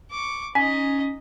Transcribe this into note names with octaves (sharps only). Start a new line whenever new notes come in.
C#6 D6
C#4 D#4 D#5 G#5 B6